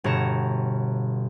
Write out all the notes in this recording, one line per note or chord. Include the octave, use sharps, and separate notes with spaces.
G1 B2 C#5 A#5 C#7 E7